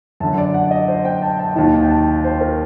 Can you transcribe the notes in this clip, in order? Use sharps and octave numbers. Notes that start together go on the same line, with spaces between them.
F#2 D3 A5
D5
F#5
D#5
C5
G5
A5
A5
D#2 D#3 A5
G5
A5
C5
A#4